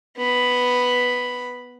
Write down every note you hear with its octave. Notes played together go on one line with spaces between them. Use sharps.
B3 B5